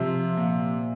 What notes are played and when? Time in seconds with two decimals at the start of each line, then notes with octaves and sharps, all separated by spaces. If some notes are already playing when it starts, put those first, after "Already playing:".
Already playing: C3 F3
0.37 A#2